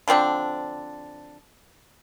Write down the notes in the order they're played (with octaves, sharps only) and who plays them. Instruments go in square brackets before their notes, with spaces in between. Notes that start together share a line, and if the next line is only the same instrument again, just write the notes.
[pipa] D3 F3 C4 D4